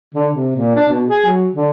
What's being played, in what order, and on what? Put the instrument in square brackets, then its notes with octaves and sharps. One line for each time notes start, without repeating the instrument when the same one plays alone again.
[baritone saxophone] D3
C3
A#2
D4
B2
G#4
F#3
D3